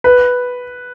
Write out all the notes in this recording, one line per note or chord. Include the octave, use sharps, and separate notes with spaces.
B4